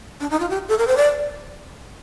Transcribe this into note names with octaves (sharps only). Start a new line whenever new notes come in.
D4
D#4
F4
G4
A4
A#4
C5
D5